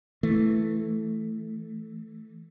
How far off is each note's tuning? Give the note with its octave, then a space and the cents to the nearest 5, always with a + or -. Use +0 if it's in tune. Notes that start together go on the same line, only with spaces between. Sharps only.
E3 +0 A3 +0